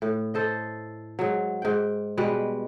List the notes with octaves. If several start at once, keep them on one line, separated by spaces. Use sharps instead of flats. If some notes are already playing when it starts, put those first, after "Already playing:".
A2
A4 C5 D#5
G#2 F#3
G#2 G5
B2 G3 G#3 B4